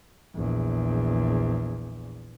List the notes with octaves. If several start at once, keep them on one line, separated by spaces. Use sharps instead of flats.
A#1 E2